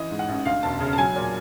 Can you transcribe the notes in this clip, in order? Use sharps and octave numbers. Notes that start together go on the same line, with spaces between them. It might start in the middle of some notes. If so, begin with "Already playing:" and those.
Already playing: E3 D#5
G#2
F#5
A1
D2 F5
E1 A5
C#3
A5
F#3 G#5
A#2